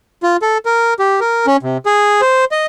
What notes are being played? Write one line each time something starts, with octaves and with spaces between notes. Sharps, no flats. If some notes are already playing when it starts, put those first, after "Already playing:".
F4
A4
A#4
G4
A#4
C#4
C3
G#4
C5
D#5